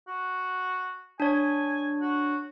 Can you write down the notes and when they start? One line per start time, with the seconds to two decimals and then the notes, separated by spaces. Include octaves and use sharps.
0.07 F#4
1.20 D4 C#5 G#5
2.01 F#4